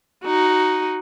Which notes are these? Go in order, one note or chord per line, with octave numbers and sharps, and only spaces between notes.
D#4 F#4